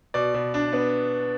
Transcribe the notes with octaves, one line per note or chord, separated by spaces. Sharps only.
B2 D5
B2
D4
B3